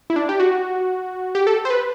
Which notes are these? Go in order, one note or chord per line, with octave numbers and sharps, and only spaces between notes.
E4
D4
G4
F#4
G4
A4
C5
B4